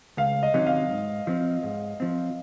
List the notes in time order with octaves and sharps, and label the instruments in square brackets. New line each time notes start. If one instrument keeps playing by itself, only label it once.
[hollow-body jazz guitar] C#2 [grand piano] F5
[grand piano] D#5
[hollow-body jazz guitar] C3 D#3 F#3 C#4
[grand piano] F5
[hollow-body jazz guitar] G#2
F3 C4
G#2
F3 C4